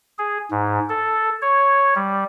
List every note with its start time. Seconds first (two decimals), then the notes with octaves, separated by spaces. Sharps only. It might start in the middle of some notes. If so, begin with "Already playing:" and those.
0.19 G#4
0.51 G#2
0.89 A4
1.42 C#5
1.96 G3